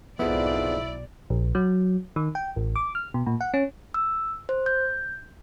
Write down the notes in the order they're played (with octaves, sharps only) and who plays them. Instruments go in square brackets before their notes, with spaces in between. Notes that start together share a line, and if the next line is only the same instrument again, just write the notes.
[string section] B1 D5 [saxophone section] F2 G#2 [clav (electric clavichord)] B3 [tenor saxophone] E4
[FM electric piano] A#1
F#3
D#3
G5
A1
D6
F6
B2
A#2
F#5
C#4
[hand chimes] E6
C5
G6